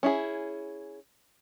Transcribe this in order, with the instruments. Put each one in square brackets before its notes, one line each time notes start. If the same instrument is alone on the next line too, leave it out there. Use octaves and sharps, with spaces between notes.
[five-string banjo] C#4 E4 G#4